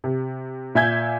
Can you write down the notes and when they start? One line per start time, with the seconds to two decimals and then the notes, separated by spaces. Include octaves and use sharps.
0.04 C3
0.75 A#2 E5 G#5 G6 G#6